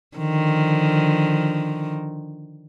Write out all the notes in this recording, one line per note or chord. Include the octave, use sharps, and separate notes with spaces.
D3 D#3 F3